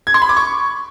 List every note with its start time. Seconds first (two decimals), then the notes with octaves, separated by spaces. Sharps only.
0.07 G#6
0.14 C6
0.22 B5
0.29 D6
0.37 C#6